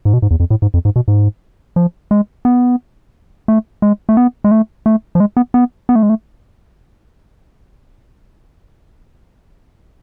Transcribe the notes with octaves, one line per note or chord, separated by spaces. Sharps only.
G#2
B2
G#2
E2
F2
A2
G#2
F2
G#2
B2
G#2
F3
G#3
B3
A3
G#3
A3
B3
G#3
A3
A3
F3
G#3
B3
B3
B3
A3
G#3
A3